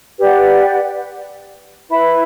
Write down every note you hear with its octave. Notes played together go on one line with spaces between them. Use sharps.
G4 B4 D5 F#5
E4 B4 E5 B5